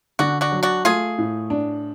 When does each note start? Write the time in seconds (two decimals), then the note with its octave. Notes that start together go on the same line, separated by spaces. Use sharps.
0.19 D3 D4 F#4
0.41 D4 F#4
0.52 F#3
0.63 D4 F#4
0.84 A3 F4 G#4
1.18 A2
1.50 D4